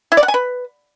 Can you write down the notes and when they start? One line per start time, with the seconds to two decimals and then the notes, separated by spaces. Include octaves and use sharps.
0.12 E4
0.17 D5
0.23 F#5
0.28 G#5
0.34 B4